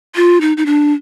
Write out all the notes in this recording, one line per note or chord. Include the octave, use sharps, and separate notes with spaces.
F4
D#4
D#4
D4